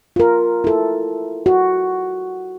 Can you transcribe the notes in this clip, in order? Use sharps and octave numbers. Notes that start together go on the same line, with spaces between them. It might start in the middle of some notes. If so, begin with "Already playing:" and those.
F4 A#4
E4 A4
F#4